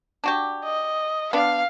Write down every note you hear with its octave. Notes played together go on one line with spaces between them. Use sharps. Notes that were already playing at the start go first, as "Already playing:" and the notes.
D4 F#4 G4
D#5
B3 D4 F5